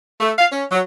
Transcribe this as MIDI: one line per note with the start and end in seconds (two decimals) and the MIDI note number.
0.20 0.31 57
0.38 0.46 77
0.51 0.65 61
0.71 0.80 54